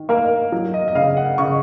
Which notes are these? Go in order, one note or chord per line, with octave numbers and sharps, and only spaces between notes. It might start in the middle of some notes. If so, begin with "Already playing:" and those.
Already playing: D#3
A#3 A#4
F#3
D#5
D#5
C#3 F5
F#5
C#3 C#6